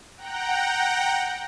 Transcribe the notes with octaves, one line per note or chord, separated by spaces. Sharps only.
F#5 G5 A#5